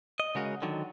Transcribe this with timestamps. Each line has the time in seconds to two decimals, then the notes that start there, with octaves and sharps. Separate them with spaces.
0.20 D#5
0.35 C#3 G#3 F#4 A#4
0.62 D3 D#3 F#3